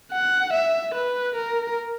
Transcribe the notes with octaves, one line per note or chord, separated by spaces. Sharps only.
F#5
E5
B4
A#4